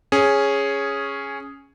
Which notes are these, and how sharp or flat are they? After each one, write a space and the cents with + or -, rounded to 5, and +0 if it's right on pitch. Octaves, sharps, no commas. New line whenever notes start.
C#4 +0 G#4 +0